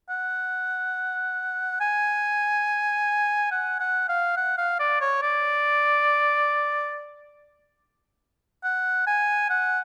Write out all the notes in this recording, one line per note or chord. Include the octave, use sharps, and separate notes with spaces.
F#5
G#5
F#5
F#5
F5
F#5
F5
D5
C#5
D5
F#5
G#5
F#5